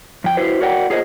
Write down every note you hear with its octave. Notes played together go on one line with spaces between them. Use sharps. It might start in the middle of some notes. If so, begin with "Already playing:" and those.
F2 G5
E4 F#4 B4 C5
F#4 A#4 C#5 D5 F#5 G5
F4 G#4 A#4 C5 C#5 D#5